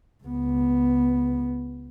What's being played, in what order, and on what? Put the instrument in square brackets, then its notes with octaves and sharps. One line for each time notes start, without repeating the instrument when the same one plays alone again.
[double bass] C#2 B3